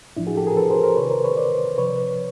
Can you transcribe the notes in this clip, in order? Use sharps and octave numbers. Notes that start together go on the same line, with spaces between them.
A2 F3 D4 E4
F#4 G#4
G4 A4
G#4 A#4
A4 B4
A#4 C5
A#4 C5
C3 D#3 B4 C#5
A#4 C5
B4 C#5
C5 D5
C3 F3 B4 C#5